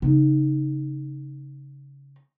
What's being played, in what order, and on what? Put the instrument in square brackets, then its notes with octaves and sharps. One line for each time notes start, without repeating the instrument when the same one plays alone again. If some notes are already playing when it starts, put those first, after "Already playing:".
[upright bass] C#3 D#4